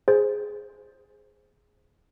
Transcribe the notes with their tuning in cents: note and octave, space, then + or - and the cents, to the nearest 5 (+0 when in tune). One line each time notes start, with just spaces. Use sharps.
G#4 +0 C5 +0